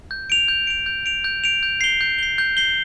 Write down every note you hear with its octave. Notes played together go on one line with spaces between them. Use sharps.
G6
D7 F7
G6
D7 F7
G6
D7 F7
G6
D7 F7
G6
C7 G7
G6
C7 G7
G6
C7 G7